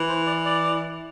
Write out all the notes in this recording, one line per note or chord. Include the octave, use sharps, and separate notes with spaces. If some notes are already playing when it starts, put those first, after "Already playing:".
Already playing: E3
C5
D5
D5